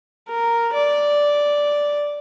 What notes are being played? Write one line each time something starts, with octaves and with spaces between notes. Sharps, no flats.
A#4
D5